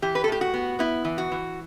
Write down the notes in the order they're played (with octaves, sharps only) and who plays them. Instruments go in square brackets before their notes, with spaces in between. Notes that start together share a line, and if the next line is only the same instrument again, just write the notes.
[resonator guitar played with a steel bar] E3 G4
B4
A4
A2 G4
F#4
B3
B3 E4
E3
F#4
E3